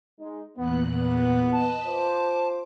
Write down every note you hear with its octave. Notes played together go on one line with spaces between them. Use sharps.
G#3 D#4
E2 A#2 B3 F#6
B3
B4 D#5 A5
F4 C5 D6